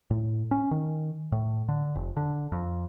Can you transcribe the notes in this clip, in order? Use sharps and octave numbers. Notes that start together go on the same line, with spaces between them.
A2
C#4
D#3
A2
D3
F1
D3
F2